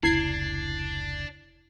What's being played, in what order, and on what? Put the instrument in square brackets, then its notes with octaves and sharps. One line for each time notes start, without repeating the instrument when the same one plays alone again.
[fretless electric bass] F1 C#2 [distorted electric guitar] D4 [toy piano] E4 [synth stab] G#6 C7